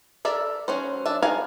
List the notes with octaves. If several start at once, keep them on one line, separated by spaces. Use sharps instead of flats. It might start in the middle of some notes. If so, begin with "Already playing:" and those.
A4 A#4 D5 E5
F#3 C#4 C5
D4 E5
F#4 A#4 F5 G#5